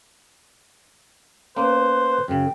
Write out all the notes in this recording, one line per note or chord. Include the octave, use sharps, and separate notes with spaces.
A#3 B3 C#4 B4 C5
F#2 C#3 G5